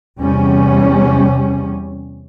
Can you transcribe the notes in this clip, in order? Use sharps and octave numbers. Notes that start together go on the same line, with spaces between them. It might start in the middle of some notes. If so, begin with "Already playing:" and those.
E2 C3 G3 C#4